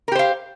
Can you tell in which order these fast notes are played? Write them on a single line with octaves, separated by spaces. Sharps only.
A#4 G4 C5 F5